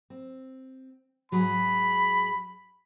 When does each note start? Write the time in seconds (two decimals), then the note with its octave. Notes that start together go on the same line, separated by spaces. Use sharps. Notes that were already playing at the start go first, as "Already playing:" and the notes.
0.10 C4
1.32 G#2 F#3 G#4 B5